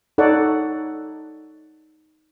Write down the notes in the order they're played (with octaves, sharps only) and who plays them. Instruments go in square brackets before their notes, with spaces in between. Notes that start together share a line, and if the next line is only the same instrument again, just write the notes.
[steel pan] D#4 A4 C#5 D5 F#5